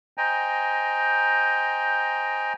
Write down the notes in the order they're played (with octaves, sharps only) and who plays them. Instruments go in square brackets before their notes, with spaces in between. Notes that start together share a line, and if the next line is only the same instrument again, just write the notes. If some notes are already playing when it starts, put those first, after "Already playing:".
[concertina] C5 D#5 G5 G#5 A#5